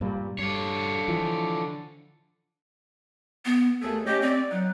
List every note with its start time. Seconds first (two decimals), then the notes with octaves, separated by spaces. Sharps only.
0.01 G2 A#2 G3
0.39 G2 D3 C#5
1.08 E3 F3
3.45 B3
3.82 D#2 A3 G#4 A4
4.06 C#4 G4 D#5
4.22 C4 D5
4.51 F#3 D#4 F#5